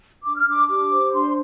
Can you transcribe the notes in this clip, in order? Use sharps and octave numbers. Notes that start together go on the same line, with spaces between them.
D4 D6
F6
D4 D6
G4 D6
C5
D4 C6